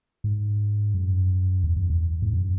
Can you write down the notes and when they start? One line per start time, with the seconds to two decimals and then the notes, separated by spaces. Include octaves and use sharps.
0.24 G#2
0.94 F#2
1.64 E2
1.76 F#2
1.90 E2
2.22 G#2
2.33 F#2